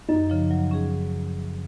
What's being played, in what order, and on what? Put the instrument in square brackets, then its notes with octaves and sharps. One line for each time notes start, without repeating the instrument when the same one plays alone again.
[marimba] F#2 [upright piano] D#4
[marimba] C#3 F3
F#3
C#4 G#4